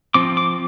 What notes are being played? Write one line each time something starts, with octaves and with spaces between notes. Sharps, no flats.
F3 C4 D6
D6